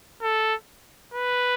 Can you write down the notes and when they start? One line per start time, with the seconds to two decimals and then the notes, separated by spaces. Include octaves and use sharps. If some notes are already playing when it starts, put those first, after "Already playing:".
0.22 A4
1.14 B4